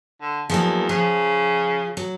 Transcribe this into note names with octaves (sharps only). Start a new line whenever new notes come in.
D3
E2 F3 F#3 A#3
C#3 F3
F#3